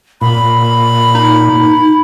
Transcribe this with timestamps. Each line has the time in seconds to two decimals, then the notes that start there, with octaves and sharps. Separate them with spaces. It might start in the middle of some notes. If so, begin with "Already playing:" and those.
0.21 A#2 B5
1.15 D#4